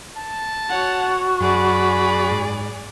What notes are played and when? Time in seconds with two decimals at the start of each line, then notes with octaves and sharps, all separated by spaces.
0.17 A5
0.69 F#4 C#5 F#5
1.41 F#2 G#4 D5 B5
2.31 G#2